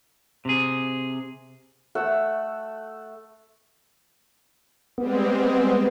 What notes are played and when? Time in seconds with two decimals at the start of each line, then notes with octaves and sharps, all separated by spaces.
0.45 C3 G#4
1.95 A3 F#5 E6
4.98 G3 G#3 B3 C4